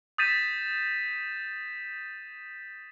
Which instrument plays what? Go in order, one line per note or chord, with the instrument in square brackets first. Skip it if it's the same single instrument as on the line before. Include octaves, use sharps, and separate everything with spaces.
[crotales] D#6 G6 A6 B6 D#7 E7